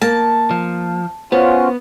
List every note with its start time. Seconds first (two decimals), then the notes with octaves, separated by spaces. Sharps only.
0.02 A#3 A5
0.51 F3
1.32 B3 C#4 F4 F#4 C5